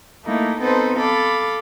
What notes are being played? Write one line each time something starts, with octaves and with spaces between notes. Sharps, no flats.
A3 A#3 D#4 E4
B3 C4 D#4 A4 B4 C5
A4 F5 B5 D6